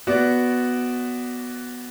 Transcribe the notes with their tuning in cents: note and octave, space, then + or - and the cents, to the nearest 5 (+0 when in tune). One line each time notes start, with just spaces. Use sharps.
B3 +0 F#4 +0 D5 -15